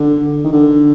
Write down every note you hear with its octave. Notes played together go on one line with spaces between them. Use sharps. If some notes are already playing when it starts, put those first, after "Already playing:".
Already playing: D3
D#3
D3